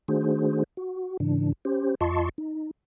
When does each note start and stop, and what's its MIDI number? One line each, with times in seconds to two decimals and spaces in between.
0.08 0.64 51
0.08 0.64 57
0.08 0.64 62
0.08 0.64 66
0.08 0.64 68
0.08 0.64 72
0.77 1.17 66
1.20 1.52 44
1.20 1.52 49
1.20 1.52 52
1.20 1.52 62
1.65 1.95 61
1.65 1.95 67
1.65 1.95 72
2.01 2.29 41
2.01 2.29 65
2.01 2.29 75
2.01 2.29 81
2.01 2.29 84
2.01 2.29 85
2.38 2.71 63